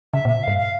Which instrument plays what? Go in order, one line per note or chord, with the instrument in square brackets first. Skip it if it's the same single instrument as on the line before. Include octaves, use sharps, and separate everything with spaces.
[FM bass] C#3 [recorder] E5
[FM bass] A#2
[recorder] E5
[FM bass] G2 [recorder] F5
[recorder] F5